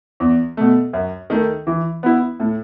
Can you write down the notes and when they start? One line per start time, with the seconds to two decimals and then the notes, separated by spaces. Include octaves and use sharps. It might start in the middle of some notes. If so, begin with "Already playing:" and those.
0.20 E2
0.57 B2 A3
0.93 F#2
1.30 D#3 A3
1.67 E3
2.03 B3 E4
2.40 A2